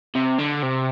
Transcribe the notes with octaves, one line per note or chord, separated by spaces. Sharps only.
C3
D3
C3